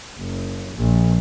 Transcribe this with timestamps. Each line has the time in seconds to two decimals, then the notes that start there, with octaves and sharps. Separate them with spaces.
0.18 F#1
0.75 A#1